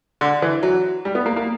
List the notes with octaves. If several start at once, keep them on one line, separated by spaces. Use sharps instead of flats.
D3
E3
F#3
G3
B3
A#3
A#3